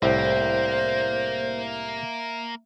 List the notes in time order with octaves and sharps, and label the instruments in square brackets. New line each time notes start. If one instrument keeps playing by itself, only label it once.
[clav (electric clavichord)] C2 A2 [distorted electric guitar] A#3 [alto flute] C5 [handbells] E5